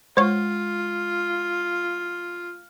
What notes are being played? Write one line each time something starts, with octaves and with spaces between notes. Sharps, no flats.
G#3 F4 C5 C#5